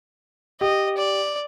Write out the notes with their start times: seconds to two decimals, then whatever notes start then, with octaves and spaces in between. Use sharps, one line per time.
0.61 G4 D#5
0.98 D5